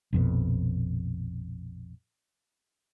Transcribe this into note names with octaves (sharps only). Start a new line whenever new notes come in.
A#1 F2 B2